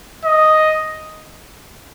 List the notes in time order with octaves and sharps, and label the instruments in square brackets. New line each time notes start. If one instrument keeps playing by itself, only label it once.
[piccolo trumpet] D#5